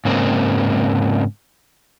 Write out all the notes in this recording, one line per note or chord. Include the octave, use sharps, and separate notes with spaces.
G#2 C#3 A#3 C4